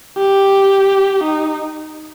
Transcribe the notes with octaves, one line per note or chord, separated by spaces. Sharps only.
G4
D#4